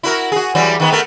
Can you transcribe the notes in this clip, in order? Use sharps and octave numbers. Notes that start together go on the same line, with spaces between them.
E4 F#4 A#4
F#4 G#4
E3 F#3 G3
D#3 B3
A3 B3 A#4